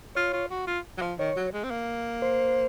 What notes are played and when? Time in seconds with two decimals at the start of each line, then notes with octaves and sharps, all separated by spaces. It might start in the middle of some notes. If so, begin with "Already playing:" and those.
0.15 F4 C#5
0.33 F4
0.50 F#4
0.67 F4
0.98 F#3
1.02 F3
1.19 D#3 C#5
1.36 F#3
1.53 G#3
1.64 C4
1.71 A#3
2.22 C5